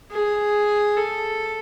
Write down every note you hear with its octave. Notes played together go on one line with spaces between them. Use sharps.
G#4
A4